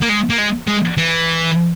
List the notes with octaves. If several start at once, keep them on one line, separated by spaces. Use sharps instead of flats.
A#3
G#3
A#3
G#3
G#3
E3